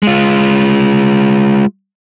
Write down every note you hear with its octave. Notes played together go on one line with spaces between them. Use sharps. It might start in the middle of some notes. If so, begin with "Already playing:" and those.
G#3 F4